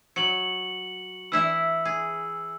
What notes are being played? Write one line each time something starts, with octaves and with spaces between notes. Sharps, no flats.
F#3 C#7 F#7
E3 E4 E5 E6
G#4